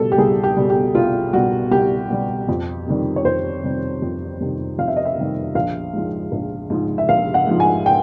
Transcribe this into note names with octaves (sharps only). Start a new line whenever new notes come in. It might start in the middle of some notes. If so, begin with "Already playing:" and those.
Already playing: B2 G3 A4
G4
C2 G#4
G4
B2 G3
G4
C2 F4
B2 G3 F#4
C2 G4
B2 G3
F2
C3 D#3 G3
C#5
F2 C5
C3 D#3 G3
F2
C3 D#3 G3
F2 F5
E5
D#5
E5
C3 D#3 G3
A#1 F5
G#2 F3 G#3
A#1
G#2 F3 G#3
E5
A#1 F5
F#5
G#2 F3 G#3
G#5
G5